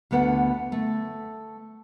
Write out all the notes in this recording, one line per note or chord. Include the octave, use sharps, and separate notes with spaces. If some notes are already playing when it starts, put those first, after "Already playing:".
D2 D3 B3 B4 F#5
A3